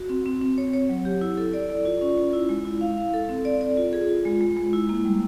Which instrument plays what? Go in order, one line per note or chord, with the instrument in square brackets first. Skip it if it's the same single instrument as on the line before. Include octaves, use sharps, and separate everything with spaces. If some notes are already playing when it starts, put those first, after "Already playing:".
Already playing: [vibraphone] F#4
C4
C4
C4
C#5
C#5
F#3
G4
E4
A4
D5
D5
F4
C#4
F4
E4
G#3
E4
F5
F5
A4
C4
D5
D5
F4
G#4
F4
G#3
G#3
G#3
E4
A#3
G3